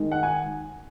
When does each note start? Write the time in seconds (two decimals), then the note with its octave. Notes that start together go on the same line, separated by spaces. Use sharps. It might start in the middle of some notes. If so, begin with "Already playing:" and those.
Already playing: D#3 G#3 D#4
0.12 F#5
0.23 G#5